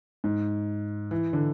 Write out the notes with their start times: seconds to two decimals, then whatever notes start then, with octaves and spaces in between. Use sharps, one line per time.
0.24 G#2
1.11 E3
1.33 D3